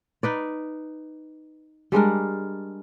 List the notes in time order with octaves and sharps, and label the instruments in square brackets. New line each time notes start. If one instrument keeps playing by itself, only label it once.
[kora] D#4 B4 D5
G3 G#3 D4 A#4